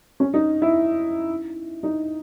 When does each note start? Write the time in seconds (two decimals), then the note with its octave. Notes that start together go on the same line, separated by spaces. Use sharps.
0.20 C#4
0.34 D#4
0.62 E4
1.83 D#4